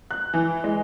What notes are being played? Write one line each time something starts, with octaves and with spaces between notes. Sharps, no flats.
F#6
E3
G#3